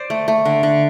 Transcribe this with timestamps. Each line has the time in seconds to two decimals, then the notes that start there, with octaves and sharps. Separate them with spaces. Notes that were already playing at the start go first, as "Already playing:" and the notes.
Already playing: C5 D5
0.10 A3
0.28 A3
0.45 D3
0.63 D3